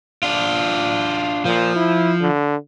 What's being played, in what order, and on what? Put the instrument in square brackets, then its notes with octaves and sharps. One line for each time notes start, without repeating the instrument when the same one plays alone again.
[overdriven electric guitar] D4 F4
[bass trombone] A#2 [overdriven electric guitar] F3
[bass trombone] E4
D3